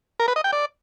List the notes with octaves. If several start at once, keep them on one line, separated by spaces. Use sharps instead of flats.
A#4
B4
D#5
G5
D5